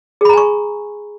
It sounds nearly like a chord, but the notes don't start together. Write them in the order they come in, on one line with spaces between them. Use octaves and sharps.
G#4 B5 A#5 G#5 C#6